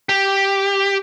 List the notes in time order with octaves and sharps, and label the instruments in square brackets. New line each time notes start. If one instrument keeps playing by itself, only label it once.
[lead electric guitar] G4